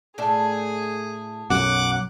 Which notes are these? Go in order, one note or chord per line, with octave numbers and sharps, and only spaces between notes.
A2 A3 D4 G#4
B1 F#2 F#5 D6